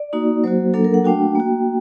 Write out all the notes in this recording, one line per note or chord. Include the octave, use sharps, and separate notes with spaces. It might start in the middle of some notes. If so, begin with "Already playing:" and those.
Already playing: D5
A#3 D#4 F#4
F#3 A#3 F#4 C5
F#3 A#3 D4 A4
A#4
F#5
A3 D4 F#4 G5
A#3 F#4